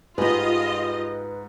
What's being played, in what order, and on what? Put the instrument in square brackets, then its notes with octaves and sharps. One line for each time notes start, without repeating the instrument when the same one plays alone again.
[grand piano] G#2 [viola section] F4 D#5 [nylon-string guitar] G4 G#4 [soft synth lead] B4